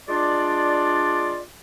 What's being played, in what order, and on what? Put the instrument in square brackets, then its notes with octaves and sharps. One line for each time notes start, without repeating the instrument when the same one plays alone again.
[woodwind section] G#3 D4 F4 D5